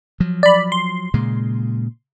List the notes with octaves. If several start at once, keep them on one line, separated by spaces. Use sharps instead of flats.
F3 F#3
D5 B5
C6
A#2 C#3 G#3